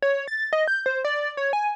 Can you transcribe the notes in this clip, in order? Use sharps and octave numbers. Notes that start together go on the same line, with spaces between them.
C#5
A6
D#5
G6
C5
D5
C#5
G#5